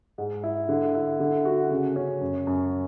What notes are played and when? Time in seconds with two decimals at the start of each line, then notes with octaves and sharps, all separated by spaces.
0.18 G#2
0.44 E4
0.69 D3
0.95 E4
1.20 D3
1.45 F#4
1.71 C#3
1.96 C#4
2.21 F#2
2.47 F#2